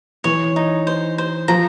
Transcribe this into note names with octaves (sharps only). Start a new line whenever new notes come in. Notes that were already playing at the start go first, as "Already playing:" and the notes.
E3 C#5
D#4
C5
C5
F3 A#5